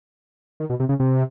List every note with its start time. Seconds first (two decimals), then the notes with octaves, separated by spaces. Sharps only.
0.60 D#3
0.70 B2
0.80 C3
0.89 C#3
1.00 C3